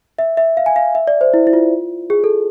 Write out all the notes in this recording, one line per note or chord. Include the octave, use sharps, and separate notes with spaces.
E5
E5
F5
G#5
F5
E5
D5
C5
E4
E4
F4
G#4
A4